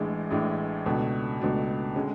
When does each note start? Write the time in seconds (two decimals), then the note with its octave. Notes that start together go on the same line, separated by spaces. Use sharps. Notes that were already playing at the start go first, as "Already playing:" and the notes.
Already playing: A1 A2 G#3 D4
0.30 A1 A2 G#3 D4
0.86 C#2 B2 A3 D4 F#4
1.41 C#2 B2 A3 D4 F#4
1.96 D3 G#3 C#4